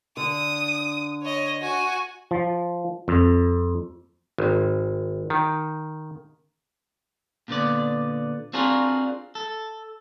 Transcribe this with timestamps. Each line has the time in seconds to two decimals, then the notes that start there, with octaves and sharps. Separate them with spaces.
0.17 D3 D#6
1.23 C#5 D#5
1.60 F#4 G#5
2.31 F3
3.08 F2
4.38 G#1
5.30 D#3
7.48 A#2 D3 B3 D5
8.53 C4 D4 F4 F#4 G#4 A#4
9.35 A4